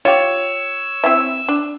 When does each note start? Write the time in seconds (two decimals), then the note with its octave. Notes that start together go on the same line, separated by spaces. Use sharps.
0.05 F4 G4 C#5 E6
1.04 C4 E4 E5
1.48 D4